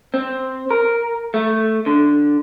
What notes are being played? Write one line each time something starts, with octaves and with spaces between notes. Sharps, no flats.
C4
A#4
A3
D3